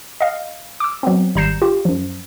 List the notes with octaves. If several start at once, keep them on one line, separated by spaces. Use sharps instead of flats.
D#5 F5
D6 E6
F#3 B3 C4
G#1 G3 A#5 G6 C7 E7
F4 G4
F#2 F3